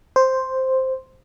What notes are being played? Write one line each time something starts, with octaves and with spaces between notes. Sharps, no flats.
C5